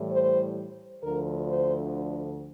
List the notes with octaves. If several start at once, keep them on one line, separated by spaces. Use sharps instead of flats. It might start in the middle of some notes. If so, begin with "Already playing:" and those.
Already playing: A2 E3 G3
C5
D2 D3 F3 A#4
C5